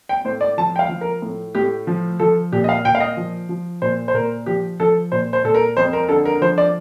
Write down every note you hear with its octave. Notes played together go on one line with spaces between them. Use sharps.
G5
A2 C5
D5
F3 A5
G5
F5
F3
A#4
A2
A2 G4
F3
F3 A4
A#2 G4
D#5
F5
A#2 G5
F5
D#5
F3
F3
A#2 C5
C5
A#2 A#4
F3 G4
F3 A4
A#2 C5
C5
A#2 A4
A#4
F2 C5
A#4
D3 A4
A#4
F3 C5
D5